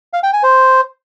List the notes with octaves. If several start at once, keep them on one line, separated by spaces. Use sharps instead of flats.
F5
G5
G#5
C5